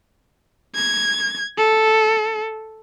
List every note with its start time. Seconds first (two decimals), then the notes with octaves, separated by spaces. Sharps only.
0.75 G#6
1.57 A4